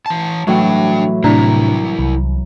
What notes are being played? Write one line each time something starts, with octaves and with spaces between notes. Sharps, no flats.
E3 A5
A2 E3 F#3 G3 D4 G5
A2 C3 G3 D4 E4 A#5
C2